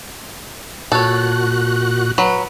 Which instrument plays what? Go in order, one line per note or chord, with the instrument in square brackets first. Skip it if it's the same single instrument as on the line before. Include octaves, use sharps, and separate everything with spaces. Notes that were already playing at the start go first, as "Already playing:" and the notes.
[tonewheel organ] A#2 F#4 F#6 [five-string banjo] A4 C#5
[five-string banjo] F#3 B4